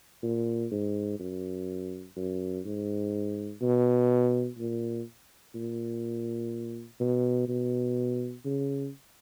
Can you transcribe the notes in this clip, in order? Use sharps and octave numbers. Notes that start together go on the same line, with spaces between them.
A#2
G#2
F#2
F#2
G#2
B2
A#2
A#2
B2
B2
C#3